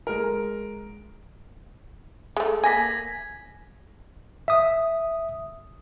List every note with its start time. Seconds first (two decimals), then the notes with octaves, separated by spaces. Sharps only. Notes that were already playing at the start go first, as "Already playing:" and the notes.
0.07 G#3 A#4
2.37 G#3 A3
2.64 A#3 G#5 G#6 A#6 B6
4.48 E5 D#6